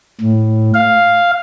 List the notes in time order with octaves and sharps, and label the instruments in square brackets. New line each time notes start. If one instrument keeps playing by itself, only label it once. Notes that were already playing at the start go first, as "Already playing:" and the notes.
[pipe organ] A2
F5